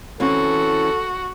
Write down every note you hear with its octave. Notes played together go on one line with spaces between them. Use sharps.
E3 C4 C#4 F#4 A4